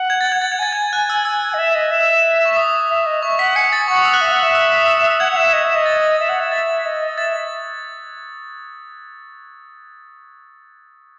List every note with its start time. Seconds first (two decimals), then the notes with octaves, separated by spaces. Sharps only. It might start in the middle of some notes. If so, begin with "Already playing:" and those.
Already playing: F#5
0.10 G#6
0.21 A6
0.32 G#6
0.42 A6
0.52 G#6
0.59 G#5 A6
0.73 G#6
0.93 F#6
1.10 E6
1.25 E6
1.54 D#5
1.58 E5
1.75 D#5
1.91 E5
2.45 C#6
2.57 D#6
2.90 E5
3.06 D#5
3.23 E5 C#6
3.39 F#5 B6
3.56 G#5 C#7
3.72 G#5 A6
3.88 F#5 C#6
3.97 D#6
4.05 E6
4.14 F#6
4.21 E5
4.32 F#5
4.43 E5
4.55 E6
4.72 D#6
4.88 E6
5.05 E6
5.20 F#5 G#6
5.32 F#5
5.36 E5
5.53 D#5
5.64 E5
5.75 D#5
5.86 A6
6.20 E5
6.29 F#5
6.40 E5
6.51 A6
6.85 D#5
7.18 E5 A6